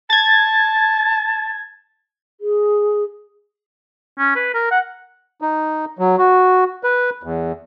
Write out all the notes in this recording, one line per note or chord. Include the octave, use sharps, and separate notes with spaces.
A5 G#6 A6
G#4
C#4
B4
A#4
F#5
D#4
F#3
F#4
B4
E2